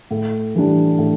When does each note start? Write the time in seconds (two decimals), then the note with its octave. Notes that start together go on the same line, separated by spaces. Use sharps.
0.11 A2
0.55 E3 G3 D4
0.98 A2